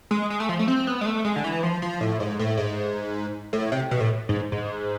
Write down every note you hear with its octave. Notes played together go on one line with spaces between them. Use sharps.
G#3
G#3
A3
F3
A3
C4
B3
G#3
A3
G#3
D3
E3
F3
F3
A2
G#2
A2
G#2
A2
C3
B2
A2
G#2
G#2